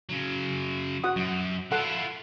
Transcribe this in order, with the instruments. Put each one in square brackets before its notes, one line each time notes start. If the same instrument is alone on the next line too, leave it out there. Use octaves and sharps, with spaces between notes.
[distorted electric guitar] C#3 F#3
[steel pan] F#4 F#5 D#6
[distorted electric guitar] F#2
[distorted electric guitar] E4 F4 [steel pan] A4 F#5